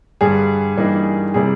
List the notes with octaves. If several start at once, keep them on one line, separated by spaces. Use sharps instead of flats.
G2 D3 G3 G#4
G2 E3 G3 A#3 D#4
C3 E3 G3 G#4